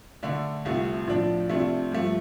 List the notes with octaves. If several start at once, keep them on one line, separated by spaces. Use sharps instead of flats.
D3 A3 D4
C2 C3 A3 F4
A2 F3 D4
C3 A3 D4 F4
G2 F3 A3